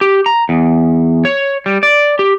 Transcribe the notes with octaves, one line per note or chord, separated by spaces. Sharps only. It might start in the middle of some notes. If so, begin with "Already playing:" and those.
G4
A#5
E2
C#5
G3
D5
G4